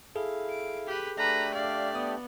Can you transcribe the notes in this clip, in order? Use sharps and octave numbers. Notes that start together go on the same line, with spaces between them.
E4 G#4 A4 F5
D7
G4 B4
A3 D4 G4 B4 A#5
D5 F5
B3 D#6